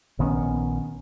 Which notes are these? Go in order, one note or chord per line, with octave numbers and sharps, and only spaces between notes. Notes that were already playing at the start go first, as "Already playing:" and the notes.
A#1 D#3 B3 C#4